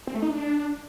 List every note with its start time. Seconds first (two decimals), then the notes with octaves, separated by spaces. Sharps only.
0.07 C4
0.15 A3
0.22 D#4
0.30 D4